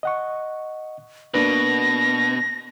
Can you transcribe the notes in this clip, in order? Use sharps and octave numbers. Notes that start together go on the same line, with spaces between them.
D#5 F#5 C#6
B2 A#3 D4 B4 A#6